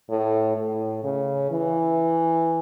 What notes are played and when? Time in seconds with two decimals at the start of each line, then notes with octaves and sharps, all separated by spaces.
0.09 A2
0.57 A2
1.04 C#3
1.51 E3